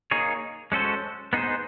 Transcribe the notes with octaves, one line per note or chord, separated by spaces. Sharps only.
A#3 D#4 G#4 C#5
G#3 C#4 F#4 A4 C5
B3 D#4 G#4 C5